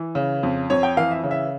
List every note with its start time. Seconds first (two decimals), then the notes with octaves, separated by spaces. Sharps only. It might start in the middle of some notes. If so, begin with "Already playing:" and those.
Already playing: E3
0.15 C#3
0.43 F2
0.70 F2 C#5
0.83 G5
0.97 E3 F5
1.11 E5
1.23 C#3
1.31 E5